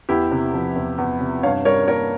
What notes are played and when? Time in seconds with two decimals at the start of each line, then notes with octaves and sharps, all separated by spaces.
0.09 E2 E4 G4
0.31 C3
0.54 F3
0.76 E2
0.98 E2
1.21 C3
1.43 G2 C#5 F5
1.65 G3 A#4 C#5
1.88 A#3 A#4 C#5